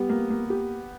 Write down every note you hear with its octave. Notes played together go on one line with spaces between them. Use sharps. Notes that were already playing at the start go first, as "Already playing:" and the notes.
Already playing: G3 B3
A#3
A#3
G4